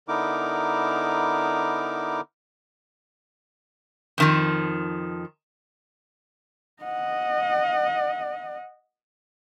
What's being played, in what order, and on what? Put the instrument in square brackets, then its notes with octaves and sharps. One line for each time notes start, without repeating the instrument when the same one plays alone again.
[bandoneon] D3 B3 D#4 E4 A#4 D6
[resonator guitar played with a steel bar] F2 D#3 F3
[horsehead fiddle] D#5 F#5